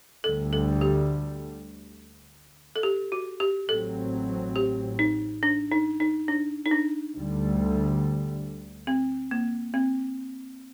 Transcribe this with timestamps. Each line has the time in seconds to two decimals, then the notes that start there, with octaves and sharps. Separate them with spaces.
0.24 D2 D3 G3 A4
0.53 A4
0.81 G4
2.76 A4
2.83 G4
3.12 F#4
3.40 G4
3.69 A1 A2 F#3 C4 A4
4.56 G4
4.99 D#4
5.43 D4
5.71 D#4
6.00 D#4
6.28 D4
6.66 D#4
6.71 D4
7.15 D2 D3 G3
8.87 C4
9.31 A#3
9.74 C4